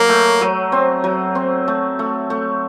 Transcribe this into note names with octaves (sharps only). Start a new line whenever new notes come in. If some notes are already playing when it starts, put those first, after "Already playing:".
Already playing: F#3 A#3
A3
F#3
C4
F#3
C4
A3
A3
A3